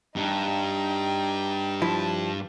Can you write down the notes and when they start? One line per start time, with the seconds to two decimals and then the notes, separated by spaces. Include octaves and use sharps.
0.16 G2 D#4 G5
1.82 F3 E4 A5